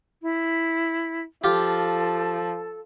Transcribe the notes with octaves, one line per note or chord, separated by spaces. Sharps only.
E4
F3 F4 G4 A4